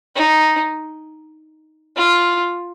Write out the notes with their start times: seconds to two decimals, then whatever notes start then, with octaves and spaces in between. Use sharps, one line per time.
0.16 D#4
1.97 F4